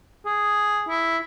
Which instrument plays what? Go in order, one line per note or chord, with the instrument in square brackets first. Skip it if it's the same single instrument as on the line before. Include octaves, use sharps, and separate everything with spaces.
[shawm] G#4
E4